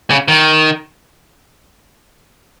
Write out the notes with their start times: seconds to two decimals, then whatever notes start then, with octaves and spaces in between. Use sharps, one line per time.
0.10 C#3
0.28 D#3